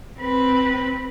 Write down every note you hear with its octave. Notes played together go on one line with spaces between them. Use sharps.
C4 B4